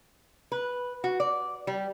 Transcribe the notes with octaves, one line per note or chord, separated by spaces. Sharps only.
B4
F#4
D5
G3